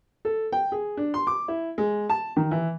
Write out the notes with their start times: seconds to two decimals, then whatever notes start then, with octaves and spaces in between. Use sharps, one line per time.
0.25 A4
0.52 G5
0.72 G#4
0.97 D4
1.14 C6
1.27 D6
1.48 E4
1.78 G#3
2.09 A5
2.36 D#3
2.51 E3